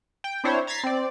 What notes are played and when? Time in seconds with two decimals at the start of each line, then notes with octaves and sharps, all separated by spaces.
0.24 G5
0.44 C4 D4 E4 C5 C#5
0.67 A#5 G#6 A6 B6 C7
0.83 C4 D5